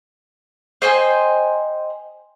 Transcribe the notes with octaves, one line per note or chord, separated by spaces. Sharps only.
C5 D#5 G5 G#5